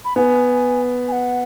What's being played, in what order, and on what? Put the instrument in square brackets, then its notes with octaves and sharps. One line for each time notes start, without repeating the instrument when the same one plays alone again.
[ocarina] B5
[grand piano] B3 [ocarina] G#5
[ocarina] G#5
F#5